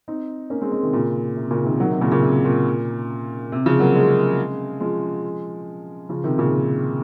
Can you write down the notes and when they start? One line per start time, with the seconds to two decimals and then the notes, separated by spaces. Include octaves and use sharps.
0.08 C4 D#4
0.50 A#3 C#4
0.61 G#3 C4
0.72 G#3 C4
0.83 C3 D#3
0.93 A#2 C#3
1.37 C3
1.51 A#2 C#3
1.65 C3 D#3
1.80 D#3 F#3
1.91 C3
2.01 A#2 C#3
2.12 A#2 C#3
2.22 C3
2.45 A#2
3.52 C3
3.66 C#3 F3
3.80 F#3 A#3
3.95 G#3 C4
4.80 F3 G#3
6.09 C#3 F3
6.24 C3 D#3
6.38 A#2 C#3